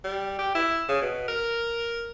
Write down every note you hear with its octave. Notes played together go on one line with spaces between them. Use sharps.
G3
G4
E4
C#3
B2
A#4